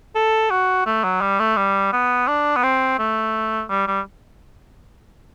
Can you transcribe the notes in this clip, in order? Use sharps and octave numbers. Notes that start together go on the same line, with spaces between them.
A4
F#4
A3
F#3
G3
A3
G3
B3
D4
B3
C4
A3
G3
G3